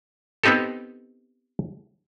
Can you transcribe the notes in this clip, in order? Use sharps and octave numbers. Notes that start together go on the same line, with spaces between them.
B3 C4 D#4 G4 A4